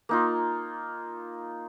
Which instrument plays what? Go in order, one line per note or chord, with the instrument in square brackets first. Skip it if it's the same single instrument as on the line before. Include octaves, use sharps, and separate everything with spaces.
[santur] A#3 D#4 F4